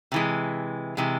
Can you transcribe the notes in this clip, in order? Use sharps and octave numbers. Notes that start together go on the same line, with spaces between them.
C3 E3 G#3
C3 E3 G#3